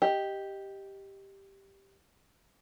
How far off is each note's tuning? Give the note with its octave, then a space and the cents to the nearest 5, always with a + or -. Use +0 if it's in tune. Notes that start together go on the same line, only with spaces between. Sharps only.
G4 +0 D#5 +0